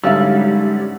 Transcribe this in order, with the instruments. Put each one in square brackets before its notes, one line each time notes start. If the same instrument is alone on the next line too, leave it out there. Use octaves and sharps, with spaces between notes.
[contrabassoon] G#2 [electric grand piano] D3 F#3 C#4 [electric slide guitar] G3 [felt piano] E5 F5 E6